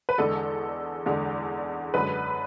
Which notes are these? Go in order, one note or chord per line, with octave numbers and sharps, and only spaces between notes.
B4
E2 D3 G#3 A4
E2 D3 G#3
F#2 D3 G#3 B4